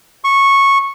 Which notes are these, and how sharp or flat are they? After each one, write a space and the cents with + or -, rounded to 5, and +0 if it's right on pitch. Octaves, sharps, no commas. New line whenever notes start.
C#6 -10